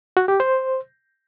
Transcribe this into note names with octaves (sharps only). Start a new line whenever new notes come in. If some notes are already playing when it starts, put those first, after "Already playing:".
F#4
G4
C5